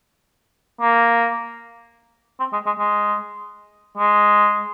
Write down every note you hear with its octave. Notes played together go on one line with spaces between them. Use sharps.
A#3
C4
G#3
G#3
G#3
G#3